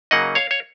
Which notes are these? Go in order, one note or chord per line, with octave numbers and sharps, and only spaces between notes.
C#3 F#3 A#3 D#4 D#5 F#5
C#5 F5
C#5